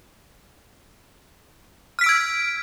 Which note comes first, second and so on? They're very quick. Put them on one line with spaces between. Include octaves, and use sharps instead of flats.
F6 B6 D7 E6 G#6